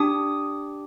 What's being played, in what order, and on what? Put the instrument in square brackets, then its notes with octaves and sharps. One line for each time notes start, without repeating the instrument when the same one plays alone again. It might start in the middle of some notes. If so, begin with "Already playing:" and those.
Already playing: [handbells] D4 G4 D#6